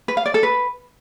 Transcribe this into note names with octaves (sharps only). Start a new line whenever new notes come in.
B4
F5
D5
A4
B4